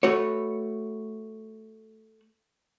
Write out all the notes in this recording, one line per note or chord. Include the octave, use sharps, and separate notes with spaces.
A3 F#4 B4 C#5